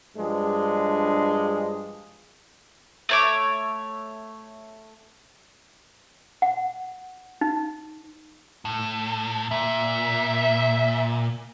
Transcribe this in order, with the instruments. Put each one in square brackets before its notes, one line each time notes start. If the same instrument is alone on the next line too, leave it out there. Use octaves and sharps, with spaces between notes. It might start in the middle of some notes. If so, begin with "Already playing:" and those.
[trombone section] G2 F3 G#3 D4
[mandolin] A3 C#5 D6
[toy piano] F#5
D#4
[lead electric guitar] A2
[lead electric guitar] A#2 [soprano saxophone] E5